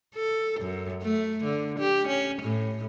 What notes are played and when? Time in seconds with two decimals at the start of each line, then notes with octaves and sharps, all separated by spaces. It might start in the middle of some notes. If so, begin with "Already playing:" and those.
0.16 A4
0.60 F#2
1.02 A3
1.44 D3
1.79 G4
2.08 C#4
2.43 A2